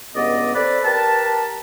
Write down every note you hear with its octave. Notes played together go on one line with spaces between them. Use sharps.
C#2 G2 B3 D5 D#5
B3 C4 A4 B4 D5
G4 A#4 B4 A5